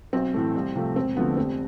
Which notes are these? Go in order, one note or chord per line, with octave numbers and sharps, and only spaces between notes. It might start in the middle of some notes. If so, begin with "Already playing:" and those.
B1 C4
A2 E3 A3
C2
C3 F3 A3
E1 C4
D2 D3 F3 A3 B3
F1 C4